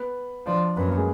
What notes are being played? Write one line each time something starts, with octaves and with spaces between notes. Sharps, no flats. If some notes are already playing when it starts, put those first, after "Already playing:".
Already playing: B3 B4
F3 D4 D5
F#2 B3 B4
A#3 A#4
G#3 G#4